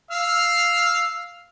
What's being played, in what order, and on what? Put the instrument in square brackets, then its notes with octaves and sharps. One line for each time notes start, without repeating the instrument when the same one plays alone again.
[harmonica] F5 E6 F6